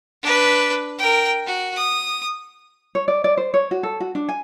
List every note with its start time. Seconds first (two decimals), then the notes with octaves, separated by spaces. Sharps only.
0.23 D4 B4
0.98 A#4 G5
1.46 F#4
1.76 D#6
2.95 C#5
3.08 D5
3.24 D5
3.37 C5
3.54 C#5
3.71 F#4
3.83 A4
4.00 F#4
4.15 D4
4.29 G#5